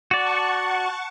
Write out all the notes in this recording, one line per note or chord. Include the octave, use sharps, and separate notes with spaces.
F#4 D5 F#5 A5 C#6